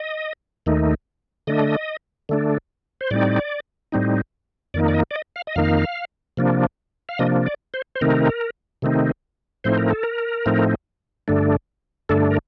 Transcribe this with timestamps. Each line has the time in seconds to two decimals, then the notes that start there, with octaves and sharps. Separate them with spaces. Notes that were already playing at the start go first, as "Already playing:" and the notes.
Already playing: D#5
0.66 D#2 D#3 A3 D#4
1.47 D3 A3 D4 D#5
2.29 D3 A3 D4
3.01 C5
3.11 A2 G3 C4 D#4 D5
3.92 A2 G3 C4 D#4
4.74 F2 D#3 A#3 D#4 D5
4.88 D5
4.94 D#5
5.11 D5
5.16 D#5
5.36 F5
5.47 D#5
5.56 F2 D#3 A#3 D#4 F5
6.37 C3 F3 A#3 D4
7.09 F5
7.19 C3 F3 A#3 D4 D#5
7.46 D5
7.74 C5
7.95 C5
8.01 C3 D#3 A3 C4 D#4 A#4
8.82 C3 D#3 A3 C4 D#4
9.64 A2 F3 A3 C4 D#4 C5
9.78 A#4
9.91 A4
10.03 A#4
10.46 A2 F3 A3 C4 D#4
11.28 G2 D3 A3 D4
12.09 G2 D3 A3 D4 A4
12.30 A#4